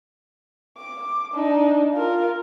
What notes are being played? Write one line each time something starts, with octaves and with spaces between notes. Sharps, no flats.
D6
D4 D#4
F4 A#4